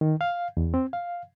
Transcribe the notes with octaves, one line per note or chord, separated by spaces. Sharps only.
D#3
F5
E2
C4
F5